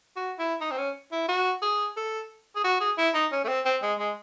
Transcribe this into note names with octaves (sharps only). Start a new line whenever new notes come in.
F#4
E4
D#4
C4
C#4
E4
F#4
G#4
A4
G#4
F#4
G#4
E4
D#4
C#4
A3
C4
C4
G#3
G#3